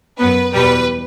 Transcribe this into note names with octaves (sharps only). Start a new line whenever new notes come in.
F#2 F#3 B3 B4
E2 B2 G3 B4